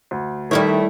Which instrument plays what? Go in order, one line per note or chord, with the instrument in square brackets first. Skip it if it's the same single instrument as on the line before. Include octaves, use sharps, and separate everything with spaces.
[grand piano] D2
[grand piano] D#3 [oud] G3 E4 C#5 [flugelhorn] A3